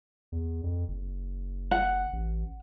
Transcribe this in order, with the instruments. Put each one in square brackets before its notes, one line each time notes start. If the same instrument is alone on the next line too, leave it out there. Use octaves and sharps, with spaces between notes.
[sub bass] E2
F2
F#1
[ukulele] F#5
[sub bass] A1